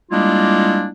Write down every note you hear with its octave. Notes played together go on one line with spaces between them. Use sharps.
G3 G#3 A#3 D4 E4 F4